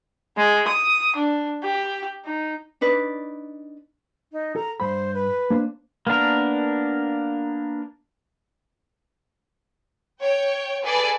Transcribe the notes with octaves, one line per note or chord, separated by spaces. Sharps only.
G#3
D#6
D4
G4
D#4
D4 D#4 B4 D5
D#4
A4 A#5
G2 C5 B5
B4
A#3 D4 C5
A#3 B3 D4 A#4
C#5 G5
G#4 A4 B4 D5